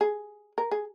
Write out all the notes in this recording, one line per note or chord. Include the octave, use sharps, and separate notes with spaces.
G#4
A#4
G#4